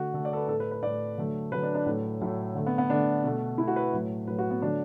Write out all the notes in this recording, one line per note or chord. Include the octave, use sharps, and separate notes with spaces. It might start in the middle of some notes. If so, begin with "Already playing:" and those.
Already playing: D3 A3 F#4
D3 A3 A4
D5
A4
B4
A2 A3 A4
B4
B4
A2 A3 D5
D3 F#3 A3
D3 F#3 A3 B4
D4
D4
A2 F#3 A3
A2 F#3 A3
D3 A3
B3
B3
D3 A3 D4
B2 A3
B2 A3 E4
F#4
B4
A2 F#3 A3
A2 F#3 A3 B4
F#4
B3
D3 F#3 A3 D4